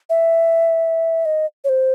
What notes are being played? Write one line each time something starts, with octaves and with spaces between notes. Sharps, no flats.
E5
D#5
C#5
C5